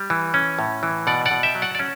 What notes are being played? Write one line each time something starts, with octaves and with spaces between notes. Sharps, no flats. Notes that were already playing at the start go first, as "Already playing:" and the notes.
Already playing: G3
E3
C#4
A2
E3
B2 D5 F#5
D5 F#5
B2
E5 G5
F#3
D5 F#5
D5
C#4